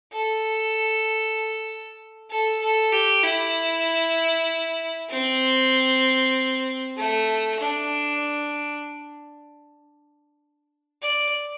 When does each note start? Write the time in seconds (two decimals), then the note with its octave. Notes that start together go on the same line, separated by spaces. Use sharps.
0.13 A4
2.31 A4
2.62 A4
2.93 G4
3.24 E4
5.10 C4
6.97 A3
7.60 D4
11.02 D5